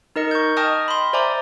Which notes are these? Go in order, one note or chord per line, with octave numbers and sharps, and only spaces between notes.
D#4 A#4 D#5 C#7
C#6 G6
D#5 G5 A5 D#6 F6
B5 C6
C5 D5 E5 G#5 A#5 D6